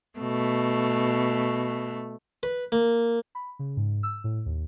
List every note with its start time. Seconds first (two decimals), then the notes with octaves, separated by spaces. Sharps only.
0.19 B2 A3
2.43 B4
2.72 A#3
3.35 B5
3.59 C#3
3.77 G#2
4.03 E6
4.24 A2
4.46 D#2